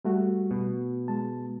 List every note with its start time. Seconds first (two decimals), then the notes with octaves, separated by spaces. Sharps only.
0.05 G3 A3 F#4
0.51 B2
1.08 G#3 A5